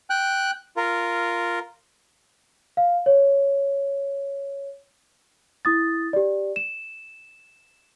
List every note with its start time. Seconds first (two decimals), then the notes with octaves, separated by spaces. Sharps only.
0.10 G5 F#6
0.77 F4 A#4
2.77 F5
3.06 C#5
5.65 E4 D#6 A6
6.13 G4 D5
6.56 E7